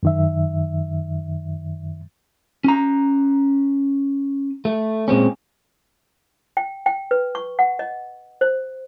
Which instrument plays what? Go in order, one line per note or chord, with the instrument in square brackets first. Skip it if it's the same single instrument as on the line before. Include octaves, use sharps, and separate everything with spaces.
[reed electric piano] F#2 D#3 E5
[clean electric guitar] C#4 A#5
A3
A#2 G#3 C4 C#4
[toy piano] G5
G5
B4
C#6
F#5
D#5
C5